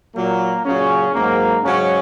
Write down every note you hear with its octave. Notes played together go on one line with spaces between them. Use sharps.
A#2 F#3 A#3
A#2 C#3 F#3 C#4
G#2 F#3 A#3
G#2 C#3 F#3 C#4